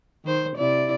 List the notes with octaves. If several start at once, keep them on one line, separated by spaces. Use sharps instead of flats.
D#3 C5
C3 E4 D5